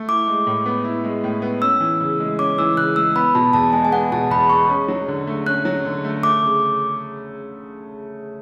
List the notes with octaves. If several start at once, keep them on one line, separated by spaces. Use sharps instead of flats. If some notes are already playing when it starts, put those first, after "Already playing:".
Already playing: A3
E4 D6
G#3
A2
B3
E4
G#3
A2
B3
C#4 E6
E3
C#3
G#3
C#4 D6
E3 E6
C#3 F#6
G#3 E6
B3 B5
B2 A5
E2 A5
G#3 G#5
G#5
B3 F#5
B2 A5
E2 B5
G#3 C#6
C#4
F#3
D3
A3
C#4 F#6
F#3
D3
A3
A3 D6
C#3